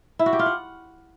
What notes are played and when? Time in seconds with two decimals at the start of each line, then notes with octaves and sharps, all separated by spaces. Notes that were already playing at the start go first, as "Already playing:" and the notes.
0.19 E4
0.26 F#4
0.33 G4
0.39 F4
0.46 F#5